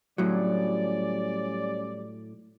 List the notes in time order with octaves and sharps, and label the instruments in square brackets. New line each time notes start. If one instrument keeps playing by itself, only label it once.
[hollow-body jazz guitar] A2 F#3 [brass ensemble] G3 C#4 D5